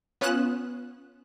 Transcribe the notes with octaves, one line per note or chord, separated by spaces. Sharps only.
B3 C#4 F4 D#6 F#6 E7